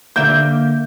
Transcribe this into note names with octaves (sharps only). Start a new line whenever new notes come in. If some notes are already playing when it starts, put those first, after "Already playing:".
D3 A#3 D5 E5 F#5 G6